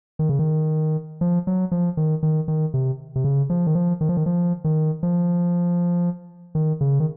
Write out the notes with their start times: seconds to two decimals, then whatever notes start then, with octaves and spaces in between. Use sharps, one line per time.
0.19 D#3
0.29 C#3
0.39 D#3
1.21 F3
1.47 F#3
1.72 F3
1.97 D#3
2.23 D#3
2.48 D#3
2.74 C3
3.16 C3
3.24 C#3
3.50 F3
3.67 D#3
3.75 F3
4.01 D#3
4.09 F3
4.17 D#3
4.26 F3
4.64 D#3
5.03 F3
6.55 D#3
6.81 C#3
7.00 D#3